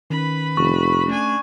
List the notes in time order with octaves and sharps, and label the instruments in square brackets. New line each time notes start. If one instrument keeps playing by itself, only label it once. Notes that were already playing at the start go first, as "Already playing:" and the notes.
[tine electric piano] D#3 C#4 [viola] B4 B5
[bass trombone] F1 [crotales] C#6
[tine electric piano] A3 C#4 [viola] D4 G#5